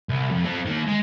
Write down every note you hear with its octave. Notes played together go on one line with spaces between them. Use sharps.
C2
F2
C4 A4
D#3 A#3
G#3